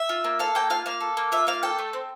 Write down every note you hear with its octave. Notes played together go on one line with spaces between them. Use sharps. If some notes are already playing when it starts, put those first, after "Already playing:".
Already playing: E5
F4
A#3
A4 F5
A#3 G5
F4 F5
A#3 F5
A4
A#3
F4 E5
A#3 F5
A4 G5
A3
C4